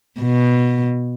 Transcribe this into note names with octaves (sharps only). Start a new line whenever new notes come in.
B2